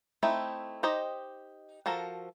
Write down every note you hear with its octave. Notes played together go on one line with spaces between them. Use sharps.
A3 C4 D#4 E4
D#4 G4 C5 D#5
F3 F#4 A4 A#4